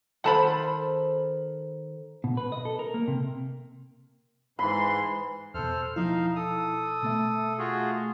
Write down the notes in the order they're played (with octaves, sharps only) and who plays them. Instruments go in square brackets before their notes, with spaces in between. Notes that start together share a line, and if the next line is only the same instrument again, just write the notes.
[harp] D#3 A4 C5 [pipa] F#5 A5 B5
[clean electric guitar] B2
B4
D#5
A4
A#4
A#3
C3
[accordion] G#2 E3 C6 [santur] B5
[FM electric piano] E2 B2 [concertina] A4 C5 F6
[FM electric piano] B2 F3 E4 [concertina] D#4 F5
[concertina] A4 D#6
[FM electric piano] B2 A3 E5
[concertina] F4 F#4 G#4